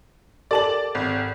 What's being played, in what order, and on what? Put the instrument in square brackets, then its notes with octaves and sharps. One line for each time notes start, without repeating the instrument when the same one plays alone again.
[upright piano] G4 A4 A#4 [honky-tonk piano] D5 A5 F#7
[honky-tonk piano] G#1